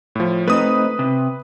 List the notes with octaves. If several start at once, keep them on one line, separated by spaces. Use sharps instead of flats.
A2 F3
A3 C4 D#4 B4 D#6
C3